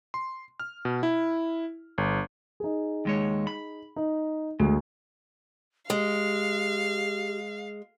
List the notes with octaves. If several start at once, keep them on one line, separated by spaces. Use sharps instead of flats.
C6
F6
B2
E4
G1
D#4 G#4
D#2 G#3 C#5
B5
D#4
D2 G#3
G#3 G4 F5